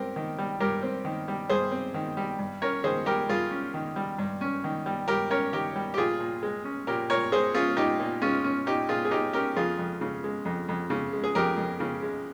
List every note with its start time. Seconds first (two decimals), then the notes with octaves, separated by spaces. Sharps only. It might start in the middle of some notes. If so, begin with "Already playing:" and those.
Already playing: G2 C4 G4 A#4
0.16 D#3
0.38 G3
0.60 G2 G4 A#4
0.83 C4
1.05 D#3
1.28 G3
1.49 G2 G#4 C5
1.72 C4
1.94 D#3
2.17 G3
2.39 G2
2.62 C#4 A#4 C#5
2.84 D#3 G#4 C5
3.06 G3 G4 A#4
3.29 G2 F4 G#4
3.51 C#4
3.74 D#3
3.96 G3
4.19 G2
4.41 C#4
4.64 D#3
4.86 G3
5.08 G2 G4 A#4
5.31 C#4 A#4 C#5
5.53 D#3 G4 A#4
5.76 G3
5.94 G4
5.97 A#2 F4 G#4
6.20 A#2
6.43 G#3
6.65 C#4
6.87 A#2 G4 A#4
7.10 A#2 A#4 C#5
7.32 G#3 G#4 C5
7.54 C#4 F4 G#4
7.77 A#2 D#4 G4
8.00 A#2
8.22 G#3 C#4 F4
8.44 C#4
8.66 A#2 D#4 G4
8.89 A#2 F4 G#4
9.05 G#4
9.11 G#3 D#4 G4
9.33 C#4 G4 A#4
9.56 F2 F4 G#4
9.79 F2
10.01 C#3
10.24 G#3
10.45 F2
10.68 F2
10.90 C#3
11.13 G#3
11.24 G#4
11.35 F2 G4 A#4
11.57 F2
11.80 C#3
12.03 G#3